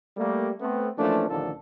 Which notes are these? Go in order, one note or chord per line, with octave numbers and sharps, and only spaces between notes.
G3 A3 A#3
A3 B3 C4
E3 F3 A3 A#3 C#4 D4
A1 D3 D#3 F3 A4